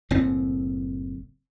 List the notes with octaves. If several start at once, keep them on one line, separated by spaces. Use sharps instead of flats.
F#1 A2 C4